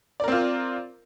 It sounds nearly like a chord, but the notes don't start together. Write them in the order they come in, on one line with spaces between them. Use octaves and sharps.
D5 A#4 C4 F4